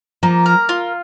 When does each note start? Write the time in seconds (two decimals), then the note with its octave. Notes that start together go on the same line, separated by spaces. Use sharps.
0.23 F3 A#3
0.46 A#4
0.69 F4